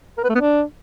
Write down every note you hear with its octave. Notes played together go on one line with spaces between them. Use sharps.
A#4
B4
A3
B3
D4